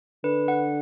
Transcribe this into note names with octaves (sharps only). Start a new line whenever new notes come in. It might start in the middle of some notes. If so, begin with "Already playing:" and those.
D3 B4
F#5